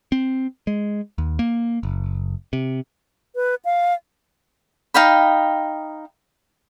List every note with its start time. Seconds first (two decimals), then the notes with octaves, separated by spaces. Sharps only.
0.12 C4
0.67 G#3
1.18 D#2
1.39 A#3
1.83 F#1
2.53 C3
3.35 B4
3.65 F5
4.94 D#4 F5 G5 B5